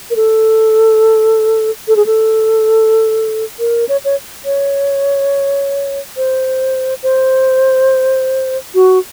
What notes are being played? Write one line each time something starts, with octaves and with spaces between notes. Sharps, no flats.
A#4
A4
A4
G#4
A4
A#4
C#5
C#5
C#5
C5
C5
F#4